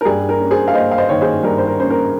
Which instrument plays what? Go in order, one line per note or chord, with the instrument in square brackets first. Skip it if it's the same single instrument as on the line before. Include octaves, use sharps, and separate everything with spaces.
[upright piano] A#4
G2 G#4
A#4
C#4
G#4 C5
F5
A#3 C5 D#5
F5
C5 D#5
D#3 C#5
G#4 C5
G2 A#4
C5
A#4
C#4 C5
A#4